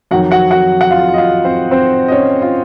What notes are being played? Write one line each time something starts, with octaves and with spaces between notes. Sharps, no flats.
F2 D#3 F#3 F#4 F#5
F#4 F#5
F#4 F#5
F#5
F4 F5
D#5
F4 F5
C4 C5
C4 C5
D#5
C#4 C#5
F4